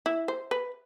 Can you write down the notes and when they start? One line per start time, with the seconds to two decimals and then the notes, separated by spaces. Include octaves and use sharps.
0.06 E4
0.28 C5
0.51 B4